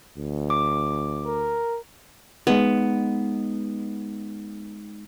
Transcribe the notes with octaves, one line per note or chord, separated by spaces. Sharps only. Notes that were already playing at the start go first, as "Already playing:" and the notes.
D2
D6
A#4
G#3 B3 D#4